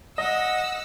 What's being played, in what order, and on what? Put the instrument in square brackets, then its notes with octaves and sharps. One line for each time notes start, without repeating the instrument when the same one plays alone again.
[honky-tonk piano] D#5 [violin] F#5 E6